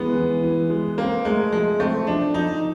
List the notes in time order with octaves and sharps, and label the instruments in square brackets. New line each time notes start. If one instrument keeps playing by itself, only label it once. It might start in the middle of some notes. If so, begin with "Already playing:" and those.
Already playing: [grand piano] E3 G#3 [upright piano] B3
[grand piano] E3
E3
G#3
[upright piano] A#3 [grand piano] C4
[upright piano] G#3 [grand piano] A3
[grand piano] F3 [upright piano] G#3
[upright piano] A3 [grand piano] C4
[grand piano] F3 [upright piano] D4
[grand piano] F3 [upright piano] D#4